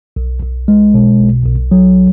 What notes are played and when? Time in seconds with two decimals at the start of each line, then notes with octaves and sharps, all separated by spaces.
0.16 B1
0.42 B1
0.68 G#3
0.94 B2
1.20 B1
1.46 B1
1.71 F#3